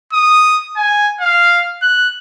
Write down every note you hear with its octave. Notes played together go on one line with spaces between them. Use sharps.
D#6
G#5
F5
F#6